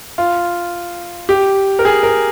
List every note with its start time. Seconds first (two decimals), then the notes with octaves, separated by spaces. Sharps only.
0.18 F4
1.29 G4
1.79 A#4
1.85 G#4
2.03 A#4